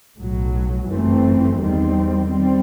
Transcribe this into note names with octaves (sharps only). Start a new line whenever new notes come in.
B1 A2 F#3
G1 F#2 E3 A3 C4
E2 D#3 G3 C4
G3 C4